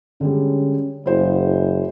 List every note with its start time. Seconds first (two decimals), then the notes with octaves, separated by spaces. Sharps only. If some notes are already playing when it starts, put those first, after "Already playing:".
0.21 D3 G3 G#3 C#4
1.06 F#1 E4 G#4 C5